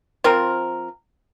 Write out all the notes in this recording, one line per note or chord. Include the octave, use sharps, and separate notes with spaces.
F3 C4 F4 A#4